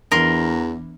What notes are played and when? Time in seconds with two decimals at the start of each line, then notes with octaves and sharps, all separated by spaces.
0.11 E2 E3 B3 D4 A#4 C6